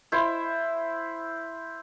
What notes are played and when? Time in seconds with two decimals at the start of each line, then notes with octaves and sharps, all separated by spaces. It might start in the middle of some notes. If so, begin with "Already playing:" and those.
0.12 E4 C5